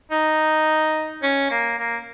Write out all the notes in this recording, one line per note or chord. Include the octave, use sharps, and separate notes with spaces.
D#4
C#4
A#3
A#3